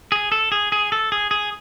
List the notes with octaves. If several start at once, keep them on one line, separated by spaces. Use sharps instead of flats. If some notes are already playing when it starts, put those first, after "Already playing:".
G#4
A4
G#4
G#4
A4
G#4
G#4